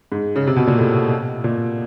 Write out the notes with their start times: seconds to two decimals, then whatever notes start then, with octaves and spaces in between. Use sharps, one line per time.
0.12 G#2
0.36 C#3
0.47 C3
0.56 B2
0.67 A#2
0.78 A2
1.44 A#2